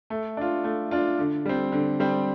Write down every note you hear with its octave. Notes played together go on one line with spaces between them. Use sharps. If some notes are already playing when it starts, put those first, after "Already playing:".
A3
D4 F4
A3
D4 F4
D3
G3 C4
D3
G3 C4